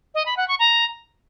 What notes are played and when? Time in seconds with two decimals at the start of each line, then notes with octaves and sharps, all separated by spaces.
0.15 D#5
0.26 B5
0.37 F#5
0.48 C#6
0.59 A#5